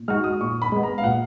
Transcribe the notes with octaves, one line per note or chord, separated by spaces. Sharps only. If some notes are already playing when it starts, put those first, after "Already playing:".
Already playing: A#2
G#3 D#4 F#4 F6
D#6
A#2 C#6
B5
G#3 B3
A#5
F5
A#2 F#5